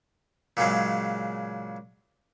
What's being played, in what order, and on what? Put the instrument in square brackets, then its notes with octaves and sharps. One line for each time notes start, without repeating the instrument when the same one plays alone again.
[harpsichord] A#2 C#3 F#3 G#3